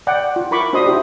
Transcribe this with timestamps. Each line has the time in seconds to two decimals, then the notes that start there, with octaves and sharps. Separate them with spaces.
0.07 D5 F#5 G5
0.36 F4
0.51 E4 A#4 B5 C#6 D6
0.73 D4 F#4 C5 D#5 C6 D#6
0.86 E4 G4